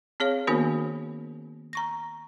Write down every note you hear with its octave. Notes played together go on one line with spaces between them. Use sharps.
C4 G#4 C#5 F5
D#3 A#3 B3 D4 F#4 A#4
A#5 C#6 A#6